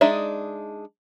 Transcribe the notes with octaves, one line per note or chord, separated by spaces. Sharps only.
G#3 D4 D#4 D5 E5